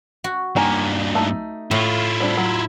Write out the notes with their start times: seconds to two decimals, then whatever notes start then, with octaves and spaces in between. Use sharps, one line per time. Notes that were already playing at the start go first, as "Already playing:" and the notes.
0.24 F#4
0.56 G2 D#3 A#3 G#5 A#5
1.15 A3 D#4
1.71 A2 E4 F4
2.21 G3 C4 D4
2.37 F#3